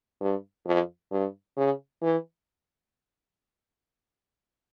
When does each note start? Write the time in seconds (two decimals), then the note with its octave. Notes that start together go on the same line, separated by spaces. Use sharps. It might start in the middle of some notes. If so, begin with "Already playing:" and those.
0.21 G2
0.66 F2
1.12 G2
1.57 C#3
2.02 E3